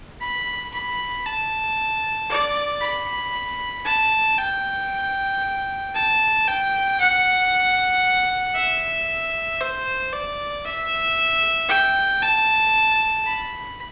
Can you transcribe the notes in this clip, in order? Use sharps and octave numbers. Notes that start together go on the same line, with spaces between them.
B5
B5
A5
D5
B5
A5
G5
A5
G5
F#5
E5
C5
D5
E5
G5
A5
B5